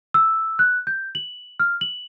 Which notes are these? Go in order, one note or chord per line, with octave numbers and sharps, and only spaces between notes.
E6
F#6
G6
F#7
F6
F#7